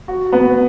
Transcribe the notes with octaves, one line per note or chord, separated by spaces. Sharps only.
F#4
B3